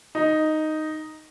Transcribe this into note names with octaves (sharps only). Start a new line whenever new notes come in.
D#4